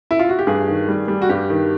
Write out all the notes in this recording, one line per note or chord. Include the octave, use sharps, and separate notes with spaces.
E4
F4
F#4
G4
G2 G#4
D#3
G3
G3
F#4
G2 G4
D#3